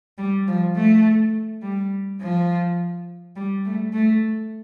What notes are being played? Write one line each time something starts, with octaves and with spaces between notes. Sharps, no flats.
G3
F3
A3
G3
F3
G3
A3
A3